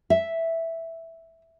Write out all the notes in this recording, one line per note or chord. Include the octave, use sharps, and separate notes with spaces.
E5